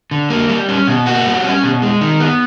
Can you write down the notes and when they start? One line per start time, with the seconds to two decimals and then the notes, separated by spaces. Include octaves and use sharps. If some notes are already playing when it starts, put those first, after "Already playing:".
0.11 D3
0.30 A#3
0.49 G3
0.68 C#4
0.87 B2
1.06 A#3 F#4
1.26 G3
1.44 C#4
1.63 B2
1.82 G#3
2.01 D#3
2.20 B3